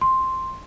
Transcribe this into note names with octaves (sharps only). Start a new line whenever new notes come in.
C6